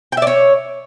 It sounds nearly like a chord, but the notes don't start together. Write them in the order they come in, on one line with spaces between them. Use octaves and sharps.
G5 E5 D5 C#5